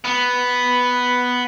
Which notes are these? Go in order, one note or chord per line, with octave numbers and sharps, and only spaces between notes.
B3